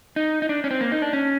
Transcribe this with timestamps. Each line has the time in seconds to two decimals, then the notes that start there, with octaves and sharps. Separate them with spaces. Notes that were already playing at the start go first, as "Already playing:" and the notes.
0.16 D#4
0.42 D#4
0.49 D4
0.64 C#4
0.71 C4
0.81 A#3
0.92 D#4
1.02 D4
1.13 C#4